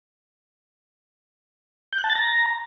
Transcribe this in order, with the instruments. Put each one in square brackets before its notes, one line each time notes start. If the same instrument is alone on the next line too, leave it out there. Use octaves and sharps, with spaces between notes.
[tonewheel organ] G6
F#6
A5
A6
A#5